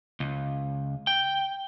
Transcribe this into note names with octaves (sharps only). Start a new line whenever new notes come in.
C#2
G5